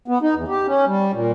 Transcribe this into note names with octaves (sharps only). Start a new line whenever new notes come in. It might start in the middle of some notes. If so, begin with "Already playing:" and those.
B3
D#4
E2
G4
C#4
G3
A#2